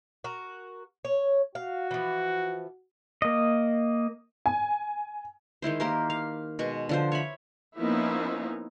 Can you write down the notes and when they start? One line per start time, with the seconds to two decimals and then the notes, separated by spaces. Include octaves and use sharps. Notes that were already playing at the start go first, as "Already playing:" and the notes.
0.24 F#4 A#4
1.05 C#5
1.55 F#4 F5
1.91 E3 F3
3.22 A#3 D#5
4.46 G#5
5.62 D#3 G#3 E4 C5
5.80 A#3 G4 A#4 C5
6.10 F5
6.59 B2 G#3 C#6
6.89 D3 F3 C5
7.12 C#5 E5 B5
7.77 F3 A#3 B3 C#4 D#4 E4